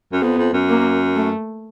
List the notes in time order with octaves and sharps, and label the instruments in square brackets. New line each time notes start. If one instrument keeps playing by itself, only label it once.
[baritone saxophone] F#2
[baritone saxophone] F2 [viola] B3
[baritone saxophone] F2
F#2
[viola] A#3
A3